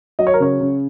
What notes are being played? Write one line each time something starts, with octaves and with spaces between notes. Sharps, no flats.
F#3 D#5
C#5
A#4
C#3 C#5
C#3